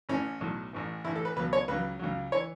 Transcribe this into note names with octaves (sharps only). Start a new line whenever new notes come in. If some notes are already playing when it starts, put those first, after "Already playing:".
A1 A2 E3 C#4
B1 A2 F#3
A1 A2 E3
A1 A2 E3 E4
A4
B4
C#2 B2 F#3 B4
C#5
C#2 C#3 F#3 B4
C#2 C#3 F#3
E3 C#5